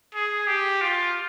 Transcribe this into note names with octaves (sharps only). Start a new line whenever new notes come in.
G#4
G4
F4